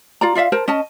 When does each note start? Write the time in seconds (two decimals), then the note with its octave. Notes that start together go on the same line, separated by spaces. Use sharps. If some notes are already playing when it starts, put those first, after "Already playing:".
0.21 F4 D5 A#5
0.35 F4 D5 E5 F5
0.52 A#4 C5 A5
0.68 C#4 D#5 A5